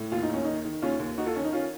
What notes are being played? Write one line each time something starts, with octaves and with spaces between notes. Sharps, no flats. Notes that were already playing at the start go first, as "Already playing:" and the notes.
Already playing: A2
D#2 F4
D#4
D#2 C#4
D#3 D#4
D#3
D#2 C#4 F4
D#2
D#3 D#4 F#4
F4 A4
D#3 C#4
D#4
D#3 C#4 F4